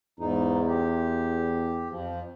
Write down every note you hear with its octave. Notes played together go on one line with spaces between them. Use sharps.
E2 G#2 D#4
G4
F2 F3